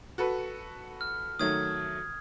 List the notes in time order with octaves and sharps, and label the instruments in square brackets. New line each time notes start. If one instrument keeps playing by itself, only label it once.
[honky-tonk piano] F#4 A4 B4
[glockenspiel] F6
[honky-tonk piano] D#3 F#3 A3 [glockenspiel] D#6 G#6